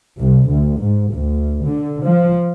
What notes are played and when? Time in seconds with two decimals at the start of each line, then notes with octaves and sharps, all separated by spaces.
0.21 C2
0.51 D2
0.82 G#2
1.15 D2
1.67 D3
2.06 F3